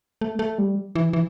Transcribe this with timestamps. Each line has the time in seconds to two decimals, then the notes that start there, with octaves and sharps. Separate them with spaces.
0.21 A3
0.39 A3
0.58 G3
0.95 E3
1.13 E3